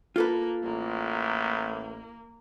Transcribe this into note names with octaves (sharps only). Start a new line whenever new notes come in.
A#3 F4 A4 B4
A1 A#3